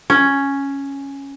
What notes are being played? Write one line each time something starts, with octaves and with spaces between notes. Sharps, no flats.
C#4